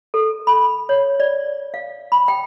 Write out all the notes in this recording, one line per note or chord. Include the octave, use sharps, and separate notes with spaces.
A4
B5
C#5
D5
F5
B5
G5